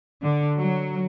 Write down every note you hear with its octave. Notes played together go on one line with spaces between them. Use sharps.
D3
F#3